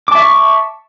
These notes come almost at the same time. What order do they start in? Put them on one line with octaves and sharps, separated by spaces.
D6 A5 E5 C#6